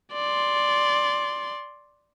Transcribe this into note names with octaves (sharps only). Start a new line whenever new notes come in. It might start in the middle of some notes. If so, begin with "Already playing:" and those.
D5 C6